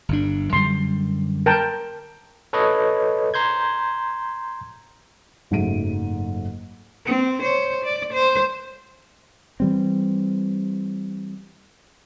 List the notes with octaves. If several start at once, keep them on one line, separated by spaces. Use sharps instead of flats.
G1 G2 D4
F#2 D3 G3 C6
A#4 G5 A5
A4 B4 C#5 D#5
A#5 C6 G6 G#6
F#1 G#2 F#3 A3 D7 D#7
C4
C5 C#5
D5
C5
E3 G3 C4